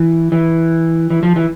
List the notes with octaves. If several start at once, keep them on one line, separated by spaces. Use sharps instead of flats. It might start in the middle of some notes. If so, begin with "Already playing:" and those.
Already playing: E3
E3
E3
F3
E3